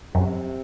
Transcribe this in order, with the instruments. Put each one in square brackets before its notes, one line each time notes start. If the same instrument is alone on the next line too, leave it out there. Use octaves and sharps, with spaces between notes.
[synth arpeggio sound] F#2 [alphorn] C3